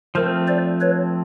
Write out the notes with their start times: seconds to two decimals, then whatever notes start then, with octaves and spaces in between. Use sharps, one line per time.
0.15 F3 A3 C4 A#4 C5
0.48 C5 D5
0.81 B4 C#5